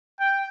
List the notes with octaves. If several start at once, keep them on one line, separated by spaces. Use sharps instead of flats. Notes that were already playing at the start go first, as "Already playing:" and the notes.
G5